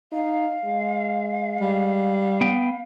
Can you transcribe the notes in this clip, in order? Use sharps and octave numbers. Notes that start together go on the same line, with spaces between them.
D#4 F5
G#3
G3
B3 G5